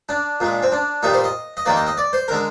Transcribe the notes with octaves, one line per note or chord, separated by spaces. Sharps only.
D4
A#2 G#3
C4
D4
A#2 G3 A#3 D#4
C5
D#5
D#5
D#2 D#3 A#3 D5
D#5
D#5
D5
C5
D3 G#3 A#4